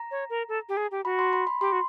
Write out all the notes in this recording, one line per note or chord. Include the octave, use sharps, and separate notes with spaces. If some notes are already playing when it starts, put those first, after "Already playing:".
Already playing: A#5
C#5
A#4
A4
G4
G#4
G4
F#4 B5
C6
B5
B5
G4 C6
F#4